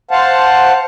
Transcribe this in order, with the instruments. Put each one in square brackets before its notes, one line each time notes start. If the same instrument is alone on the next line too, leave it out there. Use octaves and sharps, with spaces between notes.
[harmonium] C5 F5 F#5 A5